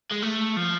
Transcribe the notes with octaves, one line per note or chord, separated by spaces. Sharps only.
G#3
A3
F3